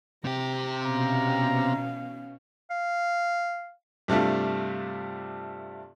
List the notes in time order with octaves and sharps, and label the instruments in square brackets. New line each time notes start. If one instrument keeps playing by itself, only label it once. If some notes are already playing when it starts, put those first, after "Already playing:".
[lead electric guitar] C3 G4 [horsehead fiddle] A#5
[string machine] B2 [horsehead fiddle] C#4 F5 [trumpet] A#5
[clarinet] F5
[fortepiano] G2 C3 A3 D4 F4